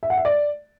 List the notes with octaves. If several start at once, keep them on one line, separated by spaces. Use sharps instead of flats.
E5
F#5
E5
D5